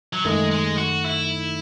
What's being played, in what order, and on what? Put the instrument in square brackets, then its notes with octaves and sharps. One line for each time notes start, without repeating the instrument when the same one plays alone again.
[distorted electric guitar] F#3
[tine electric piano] F#2 D#3 A3 D#4 [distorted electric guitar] G#3
[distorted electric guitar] G#3
F#4
E4